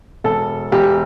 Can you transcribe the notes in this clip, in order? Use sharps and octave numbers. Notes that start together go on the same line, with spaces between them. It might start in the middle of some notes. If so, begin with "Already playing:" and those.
E1 A4
E1 G4